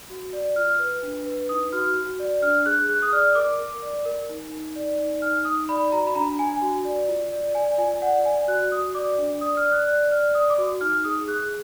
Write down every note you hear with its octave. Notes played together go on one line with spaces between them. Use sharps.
F#4
D5
F4 F6
B4
D4
B4
D#4 D#6
F#4 F6
F#4
D5
D4 F6
G#4 F#6
G#4 F#6
D#6
D5 F6
A#4 D6
A#4
D5
A#4
D#4
D#4
D5
D#4
D#4 F6
D#4 D#6
D5 B5
F#4 A#5
B5
D4 A#5
D4 G#5
F#4
D5
F4
D5
D5 G#5
F4 G#5
D5 F#5
D5 G#5
F#4 F#6
F#4 D#6
D5 D6
D4
D5 D#6
F6
D5
F#6
D5 F#6
D5 F6
D5 D#6
D6
F#4
D#4 F6
G#4 D#6
G#4 F#6